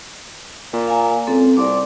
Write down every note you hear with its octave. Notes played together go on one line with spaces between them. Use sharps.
A#2
F5 G#5 A#5
C#2 C4 A4
C2 D5 C6 D6